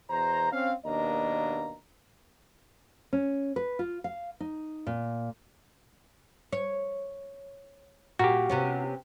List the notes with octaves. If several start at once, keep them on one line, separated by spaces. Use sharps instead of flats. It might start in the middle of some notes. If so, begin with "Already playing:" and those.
E2 B2 C5 A#5
C4 C#4 F5
D#2 B2 A#3 D4 D#5 A#5
C#4
B4
F4
F5
D#4
A#2
C#5
A#2 F#4 G4
C3 B3 C#4